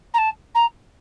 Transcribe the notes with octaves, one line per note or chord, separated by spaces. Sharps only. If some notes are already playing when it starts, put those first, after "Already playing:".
A#5
A5
A#5